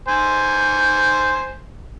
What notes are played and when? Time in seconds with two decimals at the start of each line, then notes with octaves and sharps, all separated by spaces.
0.08 C5 G#5